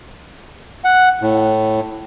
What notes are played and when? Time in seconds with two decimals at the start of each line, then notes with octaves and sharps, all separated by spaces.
0.84 F#5
1.21 A2